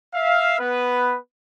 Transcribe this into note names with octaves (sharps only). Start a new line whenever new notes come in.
E5 F5
B3 B4